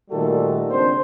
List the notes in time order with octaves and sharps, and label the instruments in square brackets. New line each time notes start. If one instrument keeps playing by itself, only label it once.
[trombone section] A#2 D#3 G3 A3 F#4 A4
C#2 C4 D4 C5